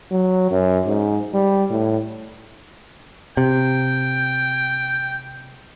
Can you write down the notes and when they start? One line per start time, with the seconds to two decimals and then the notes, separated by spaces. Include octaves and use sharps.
0.11 F#3
0.51 F#2
0.86 G#2
1.34 G3
1.70 A2
3.37 C3 G5